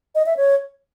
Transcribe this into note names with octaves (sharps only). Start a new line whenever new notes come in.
D#5
E5
C#5